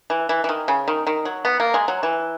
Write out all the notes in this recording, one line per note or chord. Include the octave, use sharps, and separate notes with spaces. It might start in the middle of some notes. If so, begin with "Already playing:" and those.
E3
E3
E3
D#3
C#3
D#3
D#3
F#3
B3
A#3
G#3
F#3
E3